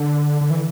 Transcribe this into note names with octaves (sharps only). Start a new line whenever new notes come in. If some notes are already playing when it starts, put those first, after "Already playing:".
Already playing: D3
D3
E3